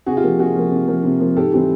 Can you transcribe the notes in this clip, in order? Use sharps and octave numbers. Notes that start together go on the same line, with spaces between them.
C3 F#4 G#4
F4 G4
F3 A#3
C3 F#4 G#4
F3 A#3
C3
F3 A#3
C3
F3 A#3
G#2 G4 A4
E3 G3 C4